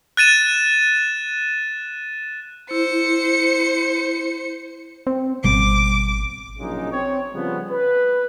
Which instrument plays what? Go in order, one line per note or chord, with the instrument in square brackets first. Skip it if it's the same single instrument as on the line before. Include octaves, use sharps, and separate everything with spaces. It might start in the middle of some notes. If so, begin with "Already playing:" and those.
[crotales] F#6 A6 D#7 E7
[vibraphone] E4 [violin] C5 C#7
[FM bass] C4
[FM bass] G#1 [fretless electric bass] B2 G3 [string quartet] D6
[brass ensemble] A#1 C#3 F#3 G#3 D#4
C4 C#5
C#3 F3 G3 B3
B4